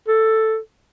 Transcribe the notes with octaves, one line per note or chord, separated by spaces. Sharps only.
A4